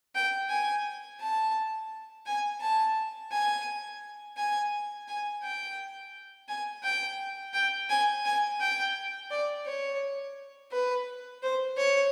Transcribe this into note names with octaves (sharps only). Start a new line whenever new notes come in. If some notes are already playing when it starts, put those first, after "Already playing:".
G5
G#5
A5
G#5
A5
G#5
G#5
G#5
G5
G#5
G5
G5
G#5
G#5
G5
D5
C#5
B4
C5
C#5